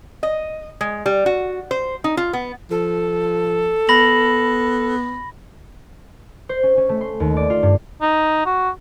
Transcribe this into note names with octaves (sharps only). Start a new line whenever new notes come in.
D#5
G#3
G3
F#4
C5
D#4
F4
B3
F3 A4
B3 B5 A#6 F#7
C5
C#4
C#4
A3
C6
D#2
D5
F4
G2
D#4
F#4